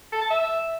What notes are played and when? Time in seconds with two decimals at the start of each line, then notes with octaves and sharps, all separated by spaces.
0.12 A4
0.22 A5
0.31 E5